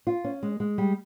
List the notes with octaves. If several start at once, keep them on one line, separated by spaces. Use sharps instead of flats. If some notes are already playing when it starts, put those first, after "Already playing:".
F4
C#4
G#3
G#3
G3